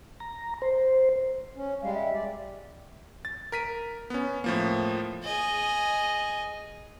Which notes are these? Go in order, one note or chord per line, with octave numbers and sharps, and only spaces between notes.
A#5
C5
C#4
G3 G#3 F5
E5
D5
A6
A#4 B6 D#7
B3 C#4
A2 F3 A#3
G#4 D#5